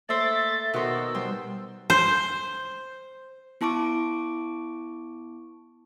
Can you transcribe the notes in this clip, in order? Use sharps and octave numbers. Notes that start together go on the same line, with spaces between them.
A3 A#3 C5 D5 E5 A6
B2 D#3 F#4 C5 E6
G3 C5
C5
B3 E4 A5 C#6 D6 D7